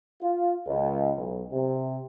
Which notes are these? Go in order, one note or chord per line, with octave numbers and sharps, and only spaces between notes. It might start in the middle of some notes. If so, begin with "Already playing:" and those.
F4
C#2
B1
C3